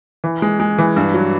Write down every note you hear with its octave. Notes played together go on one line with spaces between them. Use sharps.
E3
G#3
G#3
E3
G2
F#3